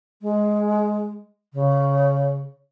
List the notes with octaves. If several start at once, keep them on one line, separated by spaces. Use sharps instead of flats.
G#3
C#3